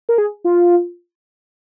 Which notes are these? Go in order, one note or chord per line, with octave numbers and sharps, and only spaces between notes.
A#4
G#4
F4